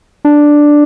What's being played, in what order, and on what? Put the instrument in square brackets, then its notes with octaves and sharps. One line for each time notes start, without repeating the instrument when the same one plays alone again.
[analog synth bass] D4